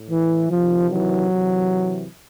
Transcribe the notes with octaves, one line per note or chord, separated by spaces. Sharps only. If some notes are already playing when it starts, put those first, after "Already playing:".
Already playing: A2
E3
C3 D#3 F3
E3 F#3
C3 E3